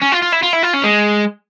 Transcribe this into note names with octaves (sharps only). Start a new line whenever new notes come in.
C#4
F4
F4
E4
F4
E4
F4
C#4
G#3